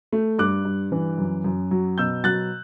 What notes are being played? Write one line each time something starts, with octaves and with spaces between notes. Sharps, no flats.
A3
G2 D6 F#6
G2
E3
F#2
F#2
F#3
B2 E6 G6
F#3 F#6 A6